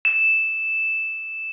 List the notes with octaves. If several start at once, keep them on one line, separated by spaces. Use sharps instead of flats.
E7